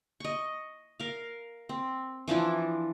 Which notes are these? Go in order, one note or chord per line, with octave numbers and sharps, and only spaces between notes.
D#5 C#6
A#4 F5
C4
E3 F3 D4 E4